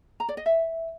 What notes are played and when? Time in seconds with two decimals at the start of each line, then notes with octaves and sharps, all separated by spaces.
0.20 A#5
0.29 D5
0.37 D#5
0.46 E5